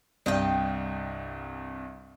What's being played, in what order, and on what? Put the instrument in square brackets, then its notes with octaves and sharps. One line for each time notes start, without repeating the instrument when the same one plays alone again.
[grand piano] C2 G2 [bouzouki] D#5 F5 G5